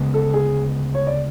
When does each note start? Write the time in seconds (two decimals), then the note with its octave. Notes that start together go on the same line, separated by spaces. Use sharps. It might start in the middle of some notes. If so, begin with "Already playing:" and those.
Already playing: D2 C#3 G#3 B3
0.14 A4
0.34 G#4
0.95 C#5
1.07 D5